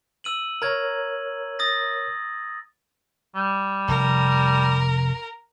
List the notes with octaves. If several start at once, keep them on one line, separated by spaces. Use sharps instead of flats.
E6 D#7 F#7
A#4 C#5 A#5 G#6
D#6 A6 A#6
G3
F1 A#4